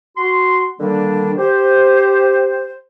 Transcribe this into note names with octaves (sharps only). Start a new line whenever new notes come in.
F#4 C6
D3 D#3 G3 A#3 D4
G4 C5